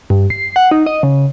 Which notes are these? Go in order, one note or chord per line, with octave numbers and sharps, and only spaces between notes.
G2
C7
F#5
D#4
D#5
C#3